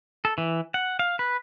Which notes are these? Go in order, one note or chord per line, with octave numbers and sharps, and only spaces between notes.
A4
E3
F#5
F5
B4